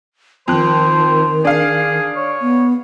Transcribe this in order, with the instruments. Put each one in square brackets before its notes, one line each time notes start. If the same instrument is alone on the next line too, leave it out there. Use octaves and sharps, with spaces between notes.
[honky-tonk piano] F2 F#6 [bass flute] D#3 [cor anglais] C5
[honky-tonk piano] D4 F5 [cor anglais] G#4
[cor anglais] C#5
[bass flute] B3